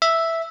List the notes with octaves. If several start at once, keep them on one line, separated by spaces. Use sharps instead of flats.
E5